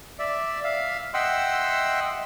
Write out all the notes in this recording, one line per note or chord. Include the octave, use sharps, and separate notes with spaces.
D5 E5
E5 F5
D#5 E5 F#5 G5 C6 E6